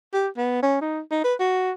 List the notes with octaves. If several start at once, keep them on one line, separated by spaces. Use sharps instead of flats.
G4
B3
C#4
D#4
D#4
B4
F#4